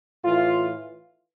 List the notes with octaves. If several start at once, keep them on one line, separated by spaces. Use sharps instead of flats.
A2 E3 F4